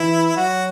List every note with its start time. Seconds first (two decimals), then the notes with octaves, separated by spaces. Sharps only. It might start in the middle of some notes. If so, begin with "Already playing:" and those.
Already playing: E3 E4
0.37 F#3 F#4